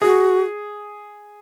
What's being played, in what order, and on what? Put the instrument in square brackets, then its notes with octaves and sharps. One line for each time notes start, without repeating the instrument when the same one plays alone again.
[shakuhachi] F#4 [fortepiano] G#4